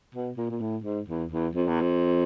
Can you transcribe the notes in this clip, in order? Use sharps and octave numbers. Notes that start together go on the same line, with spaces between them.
B2
A#2
A#2
A2
G#2
E2
E2
F2
E2
F2